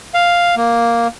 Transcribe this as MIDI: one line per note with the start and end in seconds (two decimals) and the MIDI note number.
0.14 0.55 77
0.56 1.08 58